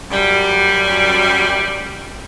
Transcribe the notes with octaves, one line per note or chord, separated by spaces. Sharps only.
F#2 G3